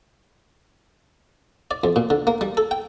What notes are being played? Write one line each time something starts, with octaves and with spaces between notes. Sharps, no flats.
D5
F2
A#2
D3
A#3
G3
A4
G5